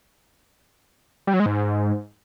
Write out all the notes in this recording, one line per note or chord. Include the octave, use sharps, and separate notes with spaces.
G3
F#3
G#3
G#2